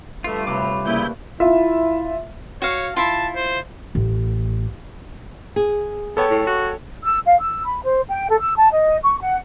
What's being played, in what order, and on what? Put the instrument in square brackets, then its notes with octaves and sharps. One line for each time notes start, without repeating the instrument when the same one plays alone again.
[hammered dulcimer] G2 [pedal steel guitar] G3 F4 [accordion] A3
[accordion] D2 [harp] C3 D6 [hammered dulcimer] A3 B4 C#5
[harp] A#2 [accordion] C#3 E4 G6
[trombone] E4 [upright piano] F4 E5
[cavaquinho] F#4 F5 [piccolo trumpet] C#5
[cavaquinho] E4 F4 [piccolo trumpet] A5
[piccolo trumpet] C5
[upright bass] A1
[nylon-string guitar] G#4
[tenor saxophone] B3 [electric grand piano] A4 C#5 G5
[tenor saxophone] A2
F#4
[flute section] E6
F5
E6
B5
C5
G5
A4
E6
A5
D#5
C#6
F#5